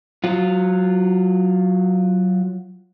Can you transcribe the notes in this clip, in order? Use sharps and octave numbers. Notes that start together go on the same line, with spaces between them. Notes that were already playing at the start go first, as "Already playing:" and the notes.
F#3 F4